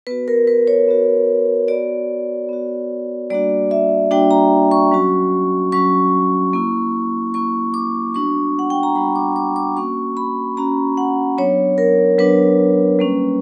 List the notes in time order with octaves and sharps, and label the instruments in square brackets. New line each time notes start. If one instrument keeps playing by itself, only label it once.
[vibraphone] B3 F#4 B4
A#4
B4
C#5
B3 F#4
B3 F#4 D5
B3 F#4
G3 A#3 D4 F#4 D5
E5
G3 A#3 D4 F#4 G5
A#5
C#6
F#3 C#4 F#4
F#3 C#4 F#4 C#6
A#3 E4
A#3 E4 C#6
D6
G3 B3 D4 F#4 C#6
F#5
G5
A#5
G3 B3 D4 F#4 B5
D6
D6
D6
A#3 C#4 F#4 C#6
B5
A#3 C#4 F#4 A#5
F#5
F#3 B3 D4 C#5
A#4
F#3 B3 D4 B4
G3 A#3 C#4